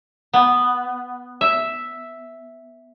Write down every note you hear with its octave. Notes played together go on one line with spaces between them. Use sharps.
B3
E5